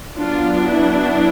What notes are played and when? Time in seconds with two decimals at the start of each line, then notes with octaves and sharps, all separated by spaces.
0.17 F#3 B3 D4 F4
0.69 E4